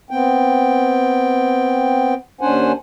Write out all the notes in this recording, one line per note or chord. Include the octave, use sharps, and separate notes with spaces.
B3 C4 G5
D#2 C#4 D4 C5 F#5 G#5